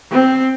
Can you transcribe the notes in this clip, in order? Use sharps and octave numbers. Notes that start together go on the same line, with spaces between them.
C4